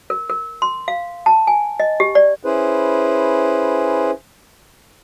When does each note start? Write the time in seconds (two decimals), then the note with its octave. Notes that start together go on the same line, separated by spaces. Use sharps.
0.10 A#4
0.30 A#4
0.62 C6
0.88 F5
1.26 A5
1.47 G#5
1.80 D#5
2.00 G4
2.15 D5
2.43 C#4 E4 G#4 B4 C5